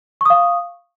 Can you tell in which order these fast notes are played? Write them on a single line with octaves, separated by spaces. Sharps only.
C#6 D#6 F5